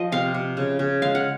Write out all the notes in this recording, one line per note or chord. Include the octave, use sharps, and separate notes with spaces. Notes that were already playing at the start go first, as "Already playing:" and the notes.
Already playing: F3 D#5
C3 F5
C3
C#3
C#3
G#3 F5
F#5